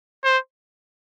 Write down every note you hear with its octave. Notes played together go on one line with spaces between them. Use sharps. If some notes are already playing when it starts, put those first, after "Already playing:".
C5